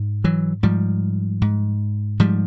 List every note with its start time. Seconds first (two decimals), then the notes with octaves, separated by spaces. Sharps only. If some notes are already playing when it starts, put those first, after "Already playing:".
Already playing: G#2
0.24 E3 F#3
0.63 G#2 F3 G3
1.42 G#2
2.20 G#2 F3 G3